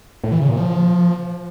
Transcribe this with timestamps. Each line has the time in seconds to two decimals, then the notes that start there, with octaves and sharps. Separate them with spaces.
0.24 A2
0.32 E3
0.40 C#3
0.49 A#2
0.57 F3